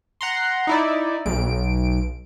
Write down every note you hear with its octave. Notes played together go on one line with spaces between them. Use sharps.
F#5 A#5 C6
D#4 E4 D5
B1 D7